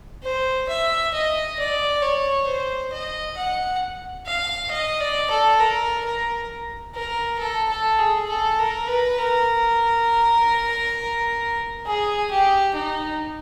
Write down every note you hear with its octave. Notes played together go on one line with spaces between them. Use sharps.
C5
E5
D#5
D5
C#5
C5
D#5
F#5
F5
D#5
D5
A4
A#4
A#4
A#4
A4
A4
G#4
A4
A#4
B4
A#4
G#4
G4
D#4